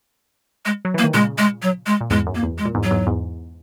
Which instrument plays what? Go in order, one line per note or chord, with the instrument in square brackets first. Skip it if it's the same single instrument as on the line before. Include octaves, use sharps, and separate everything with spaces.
[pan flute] G#3
[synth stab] F#3
[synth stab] E3 [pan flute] A#3
[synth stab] D#3
[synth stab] A#2 C#3 [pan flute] G#3
[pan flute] G#3
F#3
G#3
[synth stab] A#2
[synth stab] E2 G#2 [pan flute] G#3
[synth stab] F#2
[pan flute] A#3
[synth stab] E2
[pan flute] G#3
[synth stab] A#2
E2 G#2
[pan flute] F#3
[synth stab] E2 G#2
E2 G#2